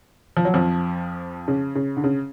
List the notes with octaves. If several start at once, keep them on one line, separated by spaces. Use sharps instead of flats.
F3
F#3
F2 F3
C#3
C#3
D3
C#3